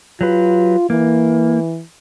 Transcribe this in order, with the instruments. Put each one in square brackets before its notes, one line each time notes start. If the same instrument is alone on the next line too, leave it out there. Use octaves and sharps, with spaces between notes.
[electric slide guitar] F#3 G4 B4 [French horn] F4
[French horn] E3 [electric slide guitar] A#3